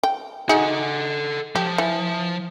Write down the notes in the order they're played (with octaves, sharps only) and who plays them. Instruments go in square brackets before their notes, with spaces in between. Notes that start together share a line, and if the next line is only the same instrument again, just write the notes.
[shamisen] G5
[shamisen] D#4 F#4 G#4 [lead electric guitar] A4 F#5
[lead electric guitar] F3 [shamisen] G4
[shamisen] E3